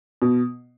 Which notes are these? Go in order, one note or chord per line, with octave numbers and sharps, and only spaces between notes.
B2